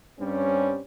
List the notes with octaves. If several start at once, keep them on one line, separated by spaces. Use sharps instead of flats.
G2 G3 C4 C#4